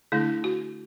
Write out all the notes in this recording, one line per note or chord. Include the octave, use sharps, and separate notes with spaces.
D3 A3 D4 E4
F#4